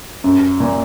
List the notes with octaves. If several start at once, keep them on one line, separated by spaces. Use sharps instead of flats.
F#2
A#2